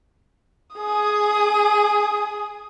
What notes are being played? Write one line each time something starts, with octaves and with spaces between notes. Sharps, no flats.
G#4 D#6